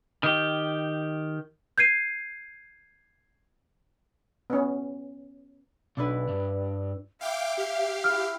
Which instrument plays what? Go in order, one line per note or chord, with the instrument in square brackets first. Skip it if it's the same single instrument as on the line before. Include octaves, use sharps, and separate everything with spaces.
[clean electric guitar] D#3 G4
[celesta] G6 G#6 C7 D#7
[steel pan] B3 C#4
[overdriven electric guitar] B1 [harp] D4 E4 B4
[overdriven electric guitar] G2
[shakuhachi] E5 [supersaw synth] F5 G5 D6
[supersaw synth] G4 F5
[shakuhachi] E4 [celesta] F6